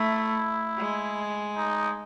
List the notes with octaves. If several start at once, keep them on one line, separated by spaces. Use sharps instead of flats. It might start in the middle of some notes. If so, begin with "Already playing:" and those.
Already playing: A3 E4
G#3
D#4